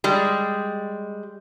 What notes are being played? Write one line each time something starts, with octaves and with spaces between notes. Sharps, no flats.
G3 G#3